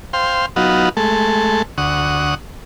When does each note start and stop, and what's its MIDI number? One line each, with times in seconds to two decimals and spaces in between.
0.13 0.46 72
0.13 0.46 77
0.13 0.46 79
0.13 0.46 84
0.56 0.89 54
0.56 0.89 59
0.56 0.89 63
0.56 0.89 65
0.56 0.89 66
0.97 1.62 56
0.97 1.62 57
0.97 1.62 69
1.78 2.35 38
1.78 2.35 78
1.78 2.35 85
1.78 2.35 87